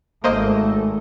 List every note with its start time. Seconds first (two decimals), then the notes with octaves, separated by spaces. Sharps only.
0.24 G#1 A3 A#3 C5 D#5